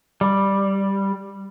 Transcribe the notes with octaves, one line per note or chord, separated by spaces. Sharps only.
G3